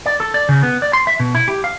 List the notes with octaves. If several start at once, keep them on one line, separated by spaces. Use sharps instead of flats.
D5
A4
D5
C#3
B3
D5
C6
E5
B2
E4
G4
F5